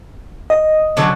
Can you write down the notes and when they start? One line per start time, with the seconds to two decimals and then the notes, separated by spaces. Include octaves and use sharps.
0.50 D#5
0.97 D3 F#3 C#4